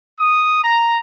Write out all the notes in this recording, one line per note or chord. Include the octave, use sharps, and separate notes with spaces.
D#6
A#5